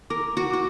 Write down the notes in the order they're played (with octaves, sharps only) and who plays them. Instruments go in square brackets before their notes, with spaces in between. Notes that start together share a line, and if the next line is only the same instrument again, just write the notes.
[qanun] A#4 [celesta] D6
[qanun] F#4
[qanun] F#4 [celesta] D6